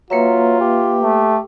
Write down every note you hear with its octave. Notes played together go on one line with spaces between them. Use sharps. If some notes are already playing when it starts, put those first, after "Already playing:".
F#3 A#3 F4 B4 E5
G4
A3